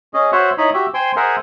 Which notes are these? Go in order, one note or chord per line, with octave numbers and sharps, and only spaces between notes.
C#4 G#4 D#5
F#4 C5 C#5 E5 F#5
D#4 E4 C#5 D#5 B5
F#4 G4 E5
C5 G5 G#5 C6
G#4 A#4 C5 E5 F#5 G#5